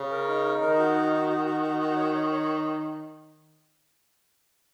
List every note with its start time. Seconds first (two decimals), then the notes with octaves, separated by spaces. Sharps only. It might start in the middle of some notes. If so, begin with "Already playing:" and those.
Already playing: C#3
0.11 A#4
0.28 D#4
0.44 D#4
0.62 D#3 A#4
0.78 F#4
0.95 D#4
1.12 F#4
1.29 F#4
1.45 F#4
1.63 F#4
1.80 F#4
1.96 C#5
2.14 C#5
2.31 C#5